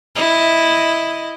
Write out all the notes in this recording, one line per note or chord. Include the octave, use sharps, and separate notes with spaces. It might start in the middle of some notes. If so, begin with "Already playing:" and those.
E4 D#5